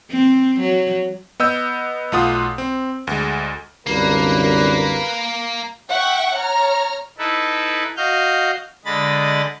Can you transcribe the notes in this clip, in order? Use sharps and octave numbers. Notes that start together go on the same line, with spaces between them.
C4
F#3
B3 D#5 E6 G6
B1 A3 F4 F#5 D#6
C4
D2 G#3
C2 F#2 D3 A#3 A#4 B4
E5 F#5 G5 C#6
C#5 A#5 F6
D#4 E4 A4 B4
F#4 D#5 F5 F6 G6
D3 G#3 D#5 B5 A6